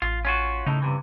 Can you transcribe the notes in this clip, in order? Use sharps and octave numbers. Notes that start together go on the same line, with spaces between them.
A1 F4
C#4 F4 F#4
A2 C#3 D#4
G2 C3 E3